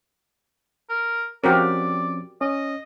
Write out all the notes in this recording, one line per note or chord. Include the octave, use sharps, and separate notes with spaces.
A#4
F3 C4 C#4 F#4 G4 A#4 D5
C#4 D#5